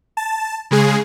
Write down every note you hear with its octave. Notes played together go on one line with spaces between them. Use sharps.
A5
C#3 G#3 G#4 G#5 C7